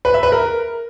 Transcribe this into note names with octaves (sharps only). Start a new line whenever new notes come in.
B4
E5
B4
A#4